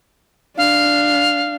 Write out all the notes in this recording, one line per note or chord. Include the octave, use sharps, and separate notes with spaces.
D4 F5